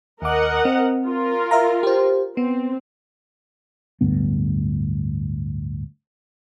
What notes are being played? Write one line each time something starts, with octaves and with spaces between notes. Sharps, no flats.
D#2 A#4 D#5 F#5 D6
C4
F4 A#4
E5 F5 A#5
G4 C5
B3 C4
D1 D2 G2 B3